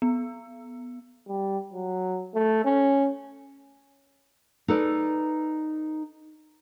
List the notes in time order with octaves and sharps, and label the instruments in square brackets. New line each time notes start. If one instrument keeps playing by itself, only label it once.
[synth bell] B3
[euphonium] G3
F#3
A3
C#4
[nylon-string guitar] D#4 A4 B4 D5